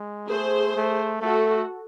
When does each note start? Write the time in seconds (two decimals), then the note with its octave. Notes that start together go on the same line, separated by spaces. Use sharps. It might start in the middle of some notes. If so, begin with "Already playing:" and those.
Already playing: G#3
0.29 A3 G#4 C5
0.76 A3
1.21 A3 F#4 A4